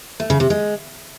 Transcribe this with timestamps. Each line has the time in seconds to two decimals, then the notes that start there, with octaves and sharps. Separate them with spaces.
0.20 A3
0.30 C#3
0.40 C3
0.50 G#3